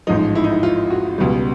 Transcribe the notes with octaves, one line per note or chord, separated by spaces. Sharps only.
A1 G#2 F3 D#4
E4
D#4
E4
F4
F#4
C#2 B2 G3